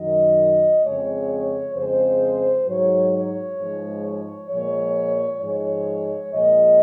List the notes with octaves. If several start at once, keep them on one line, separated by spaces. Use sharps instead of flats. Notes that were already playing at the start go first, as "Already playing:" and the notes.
Already playing: F#2 D#3 F#3 D#5
F2 C#3 G#3 C#5
C#5
F2 C#3 G#3 C5
G#2 F#3 C#5
C#5
G#2 F3 G#3
C#5
A#2 F3 G#3 C#5
G#2 F3 G#3 C#5
A#2 F3 G#3 D#5